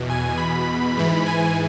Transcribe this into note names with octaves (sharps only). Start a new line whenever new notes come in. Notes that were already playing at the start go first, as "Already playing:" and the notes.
Already playing: E2 B2
G#5
B5
G#2 E3
G#5